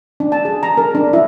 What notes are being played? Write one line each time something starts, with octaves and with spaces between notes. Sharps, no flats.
D4
A5
G#4
A#5
A#4
D4
E4